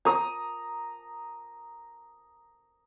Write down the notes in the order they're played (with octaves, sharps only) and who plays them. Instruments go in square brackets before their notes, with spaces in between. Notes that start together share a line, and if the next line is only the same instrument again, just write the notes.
[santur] A#5 D#6